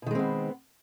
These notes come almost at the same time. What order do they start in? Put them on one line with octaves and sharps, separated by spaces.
B2 D#3 G#3 C4 B3